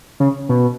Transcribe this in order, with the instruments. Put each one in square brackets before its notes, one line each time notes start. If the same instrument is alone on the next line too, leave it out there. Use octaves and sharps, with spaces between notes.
[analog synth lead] C#3
B2